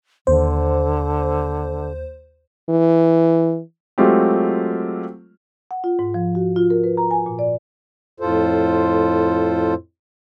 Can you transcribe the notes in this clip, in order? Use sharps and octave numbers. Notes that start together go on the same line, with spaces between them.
D#2 D3 C5
E3
F#3 G#3 A3 C4 F4 G4
F#5
F4
G#2
F3
F#4
F4
A#4
B4
A#5
G#5
A#2
D5
F2 A2 F4 A4 C5